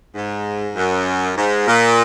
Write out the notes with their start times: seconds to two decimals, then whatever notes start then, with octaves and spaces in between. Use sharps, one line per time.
0.15 G#2
0.76 F#2
1.37 G#2
1.67 A#2